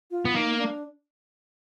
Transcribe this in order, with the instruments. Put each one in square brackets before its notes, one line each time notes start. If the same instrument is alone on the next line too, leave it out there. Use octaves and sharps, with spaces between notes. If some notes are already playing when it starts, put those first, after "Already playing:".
[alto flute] F4
[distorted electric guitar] B3
[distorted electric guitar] A#3 [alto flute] D#4
[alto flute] D4